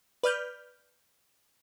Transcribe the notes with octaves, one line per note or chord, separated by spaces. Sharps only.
B4 D5 F6 G6